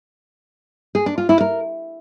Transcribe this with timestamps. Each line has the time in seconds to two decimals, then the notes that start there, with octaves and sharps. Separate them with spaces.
0.95 G#4
1.06 D4
1.18 F4
1.29 E4
1.40 A#4